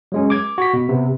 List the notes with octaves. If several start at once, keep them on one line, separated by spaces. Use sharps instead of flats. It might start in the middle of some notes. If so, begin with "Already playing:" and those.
F#3 G#3 C#4
D6 G#6
F#4 B6
B2
C3 B3